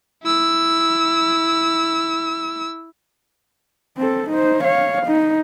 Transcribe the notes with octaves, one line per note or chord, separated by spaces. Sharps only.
E4 E6
C4 A4
D#4 C5
C#5 F5
D#4